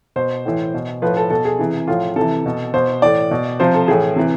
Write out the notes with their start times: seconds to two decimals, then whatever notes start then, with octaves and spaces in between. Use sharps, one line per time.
0.16 B2 C5
0.46 A2 E3
0.74 B2
1.02 A2 F3 B4
1.17 A4
1.30 B2 A4
1.45 G#4
1.59 C3 E3
1.87 A2 F3 F4
2.16 C3 A4
2.21 E3
2.46 B2
2.74 B2 C5
3.02 A2 E3 D5
3.31 B2
3.60 C3 F3 C5
3.74 A4
3.88 A2 E3 G#4
4.16 C3 E3